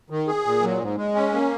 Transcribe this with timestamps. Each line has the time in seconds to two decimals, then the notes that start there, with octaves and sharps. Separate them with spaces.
0.10 D#3
0.27 G#4
0.45 A#2
0.62 F#3
0.80 G#2
0.97 G#3
1.15 C#4
1.33 A#3